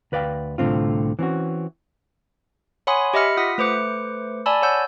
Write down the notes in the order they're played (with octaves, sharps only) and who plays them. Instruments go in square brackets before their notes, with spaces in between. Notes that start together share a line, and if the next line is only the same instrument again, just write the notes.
[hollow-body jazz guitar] D2 B4 D5 F5 G5
C2 A2 D3 C4 F4
E3 C4 C#4 F#4
[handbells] C#5 F#5 G#5 B5 C6 D#6
G4 D#5 E5 B5 F6 C#7
F4 F#5 D#6 B6
A3 B4 C5 D6 C#7
D5 G#5 A5 B5 E6
C#5 F#5 E6 G6